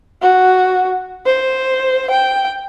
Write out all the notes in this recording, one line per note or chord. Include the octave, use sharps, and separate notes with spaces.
F#4
C5
G5